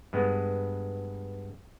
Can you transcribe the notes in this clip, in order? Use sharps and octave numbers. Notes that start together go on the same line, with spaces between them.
G2 G#3 B3